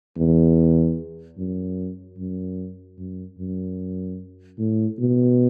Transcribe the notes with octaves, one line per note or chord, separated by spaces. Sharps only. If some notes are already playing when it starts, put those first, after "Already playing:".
E2
F#2
F#2
F#2
F#2
A2
B2